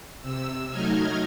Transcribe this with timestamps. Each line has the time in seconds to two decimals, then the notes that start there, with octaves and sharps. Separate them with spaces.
0.21 C3 E6
0.70 F#3 A3 D#4 D#5 F6 G#6